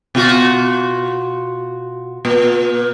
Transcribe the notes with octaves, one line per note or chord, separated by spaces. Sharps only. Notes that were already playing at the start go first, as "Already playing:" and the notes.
B2 F4 F#4
A#2